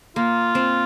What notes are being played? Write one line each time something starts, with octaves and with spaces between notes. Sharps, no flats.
A#3 F4
C4